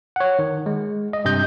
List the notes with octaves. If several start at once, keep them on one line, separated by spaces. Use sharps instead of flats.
C#5 F#5
D#3
G#3
D#5
G2 C3 D#5 G6